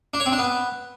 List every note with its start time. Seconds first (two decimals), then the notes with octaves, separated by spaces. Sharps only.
0.14 D4
0.20 C#5
0.26 C4
0.32 D4
0.38 B3